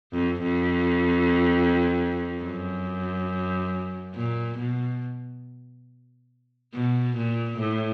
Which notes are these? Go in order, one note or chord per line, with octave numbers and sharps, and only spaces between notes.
F2
F2
F#2
A#2
B2
B2
A#2
A2